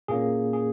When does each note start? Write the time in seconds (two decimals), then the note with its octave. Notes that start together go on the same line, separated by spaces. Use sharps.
0.08 A#2 A#3 C#4 G#4
0.53 G#4